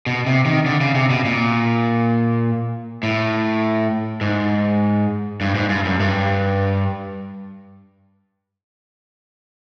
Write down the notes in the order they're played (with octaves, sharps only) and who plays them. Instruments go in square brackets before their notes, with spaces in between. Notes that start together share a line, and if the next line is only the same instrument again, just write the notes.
[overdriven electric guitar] B2
C3
D#3
D3
C#3
C3
B2
A#2
A2
G#2
G2
G#2
G2
F#2
G2